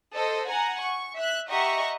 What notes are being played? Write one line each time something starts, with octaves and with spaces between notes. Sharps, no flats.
A4 C5 D#5
F#5 G#5 A#5
C#6
E5 F#6
G4 D#5 E5 F#5 A#5 C#6